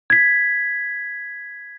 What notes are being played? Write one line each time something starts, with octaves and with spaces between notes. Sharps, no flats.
G#6 B6